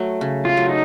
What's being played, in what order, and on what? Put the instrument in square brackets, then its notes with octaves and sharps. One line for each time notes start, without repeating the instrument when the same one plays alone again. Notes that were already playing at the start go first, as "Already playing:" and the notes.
Already playing: [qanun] F#3 A3
C#3
[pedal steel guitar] F4
[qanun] F#3 A3
[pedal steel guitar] D#4